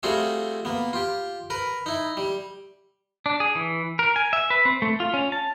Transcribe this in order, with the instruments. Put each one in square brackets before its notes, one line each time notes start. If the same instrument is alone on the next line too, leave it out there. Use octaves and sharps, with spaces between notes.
[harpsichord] G3 A3 C4 F4 F#4 G#4
A#3 B3
F4 G4
A#4 B4
D#4 E4
G3
[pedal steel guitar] D4
G#4
E3
A#4
G#5
E5
B4
C4
A3
F4
C#4
A5